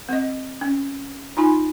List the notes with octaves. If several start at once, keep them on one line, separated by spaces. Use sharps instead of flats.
C4 D#5
C#4
D#4 F4 G#5 B5